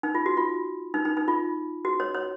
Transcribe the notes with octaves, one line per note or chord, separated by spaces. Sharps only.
D#4
F4
F#4
F4
D#4
D#4
D#4
F4
F#4
C#5
C#5